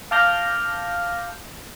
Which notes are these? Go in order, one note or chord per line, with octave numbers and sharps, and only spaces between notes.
F5 A5 D6 F6 G6 A#6